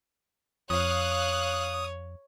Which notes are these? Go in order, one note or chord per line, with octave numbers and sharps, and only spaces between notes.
F2 C#5 F5 D#6 F#6